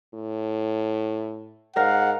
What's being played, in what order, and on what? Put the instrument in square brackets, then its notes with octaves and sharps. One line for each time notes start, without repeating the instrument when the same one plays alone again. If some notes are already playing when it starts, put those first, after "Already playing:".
[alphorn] A2
[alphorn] G#2 [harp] A#4 F5 [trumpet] F#5